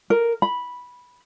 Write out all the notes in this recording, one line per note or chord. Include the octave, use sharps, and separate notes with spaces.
A#4
B5